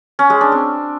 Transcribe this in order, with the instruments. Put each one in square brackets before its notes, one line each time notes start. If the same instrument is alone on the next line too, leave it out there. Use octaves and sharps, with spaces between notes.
[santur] C#4
G#3
D4
C4